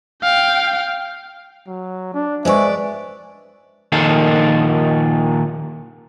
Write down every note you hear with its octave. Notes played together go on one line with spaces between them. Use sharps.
F5 G5
F#3
D4
G#3 B4 C5 D5 E5 G#5 C#6
A#2 D#3 F3 A4 F5